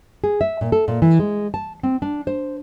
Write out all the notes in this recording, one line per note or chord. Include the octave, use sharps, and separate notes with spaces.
G#4
E5
A#2
A4
A#2
E3
G#3
A5
C4
D4
C5